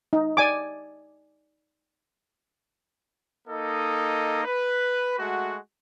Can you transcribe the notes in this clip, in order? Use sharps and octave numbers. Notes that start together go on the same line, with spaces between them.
D#4
D5 G#5 D6
A#3 D#4 A4 D#5
B4
G#3 A3 F#4